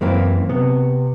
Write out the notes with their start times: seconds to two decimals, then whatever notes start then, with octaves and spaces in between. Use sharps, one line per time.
0.01 F#2 E3 A#3 C4
0.49 C3 B3